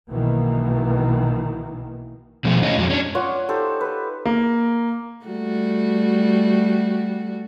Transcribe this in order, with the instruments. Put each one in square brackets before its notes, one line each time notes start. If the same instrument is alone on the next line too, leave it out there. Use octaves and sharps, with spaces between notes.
[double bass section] B1 B2 D#3 E3 A#3
[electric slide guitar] B2 D#3 F3 G#3 A3
A2 C#4 C#5 D#5 F5
F2 F#3 G#3
C#4 D4
[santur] F4 C#5 D5 F#5
D#4 G4 A4 C5
A4 B4
[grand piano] A#3
[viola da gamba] G3 A3 F#4